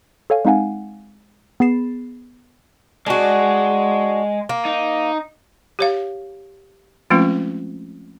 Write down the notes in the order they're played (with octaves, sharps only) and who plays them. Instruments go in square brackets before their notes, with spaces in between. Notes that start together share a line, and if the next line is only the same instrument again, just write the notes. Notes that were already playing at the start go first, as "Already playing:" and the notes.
[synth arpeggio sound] A4 C#5 F5 G#5
G#3 C4 D#4 F5 F#5 G#5
B3 G#4 B5 A6 C7 E7
[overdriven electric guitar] G#3 [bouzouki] D4 F#4
[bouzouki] A#3
[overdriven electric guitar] D#4
[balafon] G4 C#5 F5
F3 G#3 A3 C4 C#4 F4